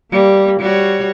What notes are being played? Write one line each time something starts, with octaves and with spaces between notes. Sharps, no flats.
G3 A#3
G3 F#4 C#5